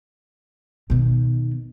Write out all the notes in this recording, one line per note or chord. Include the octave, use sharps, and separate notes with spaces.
B2 D#3